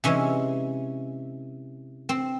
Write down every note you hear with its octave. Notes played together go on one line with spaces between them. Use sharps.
C3 E3 G#3 C#4
C4